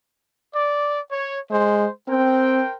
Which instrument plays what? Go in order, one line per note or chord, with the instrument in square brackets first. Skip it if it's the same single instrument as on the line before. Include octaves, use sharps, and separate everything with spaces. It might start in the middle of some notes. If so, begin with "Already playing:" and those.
[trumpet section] D5
C#5
[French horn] G#3 [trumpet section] C5
[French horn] C4 [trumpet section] A#4 C5 G5